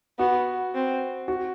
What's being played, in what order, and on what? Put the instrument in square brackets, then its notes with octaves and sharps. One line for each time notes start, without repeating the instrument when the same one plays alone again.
[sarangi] B3 [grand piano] F#4
[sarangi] C4
[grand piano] F#4